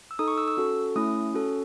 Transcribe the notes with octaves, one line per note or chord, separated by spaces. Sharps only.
E6
D#4 A4 D#6
C#6
E6
E6
C#4 F#4 A4
A3 C#4 E4 D#6
C#4 F#4 A4